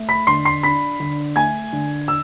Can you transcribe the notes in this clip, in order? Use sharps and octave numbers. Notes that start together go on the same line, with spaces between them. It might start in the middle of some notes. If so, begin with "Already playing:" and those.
Already playing: A3
B5 B6
D3 C6 C7
C6 C7
D4 B5 B6
D3
A3 G#5 G#6
D3
E6